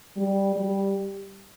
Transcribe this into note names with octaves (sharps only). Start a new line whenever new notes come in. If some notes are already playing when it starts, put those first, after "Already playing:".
G3
G3